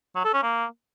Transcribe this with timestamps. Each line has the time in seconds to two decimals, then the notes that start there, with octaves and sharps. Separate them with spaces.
0.15 F#3
0.24 A4
0.34 C#4
0.43 A#3